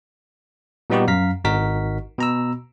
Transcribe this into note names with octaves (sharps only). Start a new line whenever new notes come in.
A#2 G3 B3 D#4 F#4 G4
F#2 F5 A#5 B6
G#1 D#4 F#4 A#4 B6
B2 A#5 E6